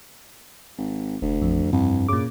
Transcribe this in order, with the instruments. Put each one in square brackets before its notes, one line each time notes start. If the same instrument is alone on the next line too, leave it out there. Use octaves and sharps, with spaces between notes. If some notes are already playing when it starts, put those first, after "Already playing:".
[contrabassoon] G#1
[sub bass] F1 [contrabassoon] D2
[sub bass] A1 [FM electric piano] F2
[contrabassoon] C2 [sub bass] G2
[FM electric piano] A#2 D6 [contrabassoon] C#3